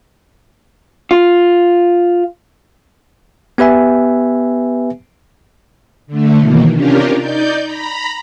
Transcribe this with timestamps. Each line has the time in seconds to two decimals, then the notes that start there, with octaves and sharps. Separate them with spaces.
1.11 F4
3.58 B3 G4 B4 E5 G#5
6.07 D3 A3
6.39 B2 D#3 E3 A#3
6.71 C3 C#4 D4 F4 G4 A#4
7.18 D#4 D5 G6
7.62 A#5 B5